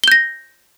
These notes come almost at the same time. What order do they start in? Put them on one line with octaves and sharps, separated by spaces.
G7 G6 A#6